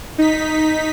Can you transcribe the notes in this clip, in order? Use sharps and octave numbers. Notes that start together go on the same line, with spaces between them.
D#4 B6